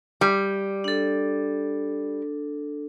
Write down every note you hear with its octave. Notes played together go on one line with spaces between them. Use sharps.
G3
D4 A4